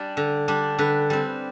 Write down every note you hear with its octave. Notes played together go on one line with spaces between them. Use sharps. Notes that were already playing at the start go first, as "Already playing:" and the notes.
Already playing: G3 D4 D5
D3
G3 D4
D3 B4
G3 C4